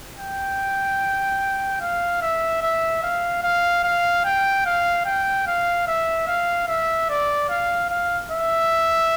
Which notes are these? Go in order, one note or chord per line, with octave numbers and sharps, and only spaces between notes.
G5
F5
E5
E5
F5
F5
F5
G5
F5
G5
F5
E5
F5
E5
D5
F5
F5
E5